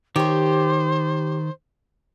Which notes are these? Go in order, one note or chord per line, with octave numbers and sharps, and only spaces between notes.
D#3 G4 C5 C#5